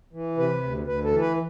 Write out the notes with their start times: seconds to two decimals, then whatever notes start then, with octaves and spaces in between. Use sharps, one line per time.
0.13 E3
0.38 C3 B4
0.63 D2
0.87 D2 B4
1.04 A4
1.12 E3
1.21 B4